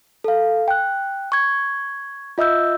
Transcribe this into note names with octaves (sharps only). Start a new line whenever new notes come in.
A4 F5
G5 F#6
C#6 G#6
F4 D#5 E5 E6 G6